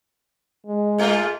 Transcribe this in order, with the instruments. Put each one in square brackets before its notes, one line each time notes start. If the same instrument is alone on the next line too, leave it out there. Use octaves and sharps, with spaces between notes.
[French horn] G#3
[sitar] G#2 A3 F4